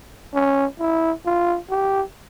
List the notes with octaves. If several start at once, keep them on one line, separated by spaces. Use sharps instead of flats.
C#4
E4
F4
G4